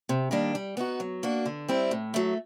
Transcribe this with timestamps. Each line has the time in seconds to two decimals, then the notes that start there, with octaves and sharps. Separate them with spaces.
0.09 C3
0.31 D#3 G3 A#3 D4
0.55 G3
0.77 B3 D#4 F#4
1.00 F#3
1.23 A#3 D4 F#4
1.46 D3
1.68 G3 C4 E4
1.91 A2
2.14 F#3 A3